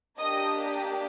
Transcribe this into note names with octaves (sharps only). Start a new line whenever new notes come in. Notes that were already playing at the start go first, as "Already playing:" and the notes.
A#3 D4 G4 D#5 D#6